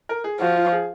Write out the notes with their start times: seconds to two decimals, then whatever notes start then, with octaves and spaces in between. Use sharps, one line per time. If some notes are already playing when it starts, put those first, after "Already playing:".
0.09 A#4
0.24 G#4
0.40 F3 F#4
0.56 F4
0.72 G#4